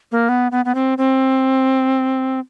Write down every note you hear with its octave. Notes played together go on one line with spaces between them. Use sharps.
A#3
B3
B3
B3
C4
C4